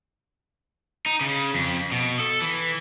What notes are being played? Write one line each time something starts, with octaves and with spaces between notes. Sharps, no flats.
D#4
C#3
F2
B2
A4
E3